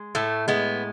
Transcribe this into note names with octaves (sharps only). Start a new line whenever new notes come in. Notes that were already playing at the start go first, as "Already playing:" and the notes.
Already playing: G#3
A2 A3
G#3 B3